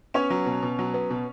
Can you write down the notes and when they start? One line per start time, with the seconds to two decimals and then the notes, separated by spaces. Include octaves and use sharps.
0.14 B3 C#4 C#5
0.30 F#3
0.46 B2
0.63 B2
0.79 F#3
0.94 B3
1.10 B2